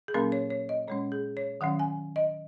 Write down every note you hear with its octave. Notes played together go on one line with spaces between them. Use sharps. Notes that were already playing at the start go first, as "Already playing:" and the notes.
G#4
A#2 F#3 A#3 C#4 A#4
C#5
C#5
D#5
A#2 G#3 C#4 C#5
G#4
C#5
D#3 F#3 C#4 F#5
G#5
D#5